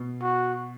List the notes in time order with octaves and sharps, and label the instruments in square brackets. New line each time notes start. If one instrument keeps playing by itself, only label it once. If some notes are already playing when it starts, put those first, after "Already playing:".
Already playing: [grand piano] B2
[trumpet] F#4